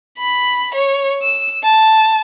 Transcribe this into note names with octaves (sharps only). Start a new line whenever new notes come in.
B5
C#5
E6
A5